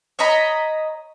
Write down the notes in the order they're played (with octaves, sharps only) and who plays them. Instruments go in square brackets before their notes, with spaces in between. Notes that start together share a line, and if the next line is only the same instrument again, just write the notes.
[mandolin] C#5 D#5 A#5 B5